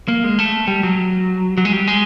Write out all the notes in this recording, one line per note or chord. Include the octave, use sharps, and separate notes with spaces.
A#3
G#3
A3
G3
F#3
F#3
G#3
G3
G#3